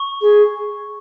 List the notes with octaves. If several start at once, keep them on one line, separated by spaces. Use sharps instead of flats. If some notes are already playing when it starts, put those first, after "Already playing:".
Already playing: C#6
G#4